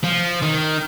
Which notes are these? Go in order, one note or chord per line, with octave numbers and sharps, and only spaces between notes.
F3
D#3